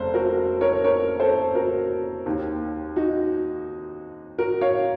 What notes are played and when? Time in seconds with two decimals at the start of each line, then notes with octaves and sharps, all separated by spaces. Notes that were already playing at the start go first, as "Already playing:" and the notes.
Already playing: F1 C#3 A4 C5
0.14 F#4 A#4
0.61 A#4 C#5
0.84 A#4 C#5
1.20 A4 C5
1.55 F#4 A#4
2.26 D#2 D#3
2.96 D#4 F#4
4.38 F#4 A#4
4.61 C#5 F5